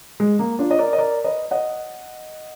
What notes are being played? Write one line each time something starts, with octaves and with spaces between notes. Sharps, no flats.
G#3
A#3
D4 F4
D#5
A#4 D5
D#5
A#4 D5
B4 D#5
D#5 F#5